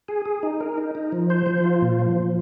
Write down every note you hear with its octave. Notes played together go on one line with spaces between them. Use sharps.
G#4
G#4
D#4
A#4
D#4
D#4
F3
C5
F3
F4
A#2
F3
F3